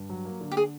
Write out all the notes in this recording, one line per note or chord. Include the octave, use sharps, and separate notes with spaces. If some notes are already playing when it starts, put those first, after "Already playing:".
Already playing: G2
F#3
A#3
D3
G4
G#4